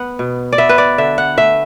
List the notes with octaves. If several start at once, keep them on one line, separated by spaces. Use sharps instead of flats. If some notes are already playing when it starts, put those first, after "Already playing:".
Already playing: B3 F#5
B2
D5
B3 E5
B4
D5
D3 E5
F#5
A3 E5